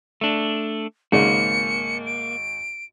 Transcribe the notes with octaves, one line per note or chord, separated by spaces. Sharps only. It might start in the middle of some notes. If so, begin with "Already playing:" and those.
A3 D4
G#1 G#2 C#3 A#3 C#7
D7